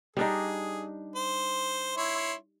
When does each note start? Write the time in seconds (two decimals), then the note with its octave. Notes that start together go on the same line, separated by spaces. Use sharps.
0.17 G3 D4 D#4 G#4
1.16 C5
1.97 E4 C#5 C6